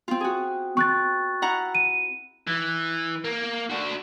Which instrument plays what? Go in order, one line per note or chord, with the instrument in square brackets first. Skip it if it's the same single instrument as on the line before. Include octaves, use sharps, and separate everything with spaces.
[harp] C4 F4
F#4 G#4
[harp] C4 [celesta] C#6 F#6 A6
[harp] E4 F#5 A#5
[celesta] D#7
[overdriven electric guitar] E3
A#3
D4 F#4